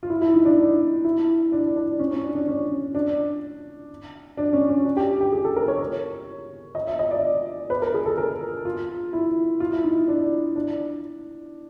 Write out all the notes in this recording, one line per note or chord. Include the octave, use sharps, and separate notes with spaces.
F4
E4
E4
D#4
D4
D#4
E4
D4
D4
C#4
C#4
D4
D4
C#4
D4
D4
C#4
C#4
D4
G4
G4
G#4
A4
A#4
C#5
D#5
E5
D#5
D5
B4
A#4
G#4
A4
A#4
F4
E4
F4
E4
D#4
D4
D4